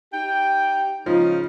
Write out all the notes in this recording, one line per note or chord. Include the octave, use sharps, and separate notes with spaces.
D#4 G4 G5
C#3 F3 G#3 D#4